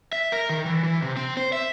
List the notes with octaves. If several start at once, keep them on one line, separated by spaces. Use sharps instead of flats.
E5
A#4
D#3
E3
E3
C3
C4
C5
E5